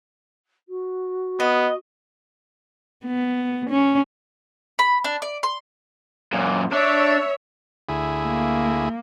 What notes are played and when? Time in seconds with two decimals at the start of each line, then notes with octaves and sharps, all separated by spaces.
0.68 F#4
1.40 B3 D#5
3.06 B3
3.70 C#4
4.79 B5
5.04 D4
5.22 D5
5.43 C6
6.33 F#2 A#2
6.72 D4 C#5 E5
7.89 D2 E4 G#4
8.25 A#3